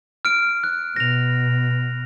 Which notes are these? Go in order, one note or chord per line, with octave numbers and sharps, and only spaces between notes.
F6 D7
F#6
B2 A#6 F7